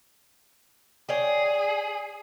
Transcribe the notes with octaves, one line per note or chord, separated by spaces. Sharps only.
G#4 C#5 D5 G5